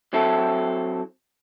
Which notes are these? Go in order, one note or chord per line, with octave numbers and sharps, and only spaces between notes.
F#3 C4 E4 A4